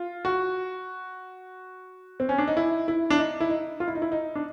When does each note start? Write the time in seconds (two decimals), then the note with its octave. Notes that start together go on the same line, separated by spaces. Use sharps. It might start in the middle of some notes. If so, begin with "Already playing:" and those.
Already playing: F4
0.25 F#4
2.20 C4
2.29 C#4
2.38 D4
2.48 D#4
2.57 E4
2.88 E4
3.10 D4
3.18 D#4
3.40 E4
3.50 D#4
3.80 F4
3.88 E4
3.95 D#4
4.02 E4
4.12 D#4
4.36 D4